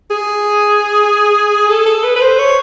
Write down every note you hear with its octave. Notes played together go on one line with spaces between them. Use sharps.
G#4
A4
A4
B4
B4
C5
C#5